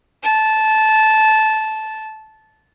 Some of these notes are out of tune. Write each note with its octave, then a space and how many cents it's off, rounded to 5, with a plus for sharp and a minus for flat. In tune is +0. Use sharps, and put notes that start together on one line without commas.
A5 -15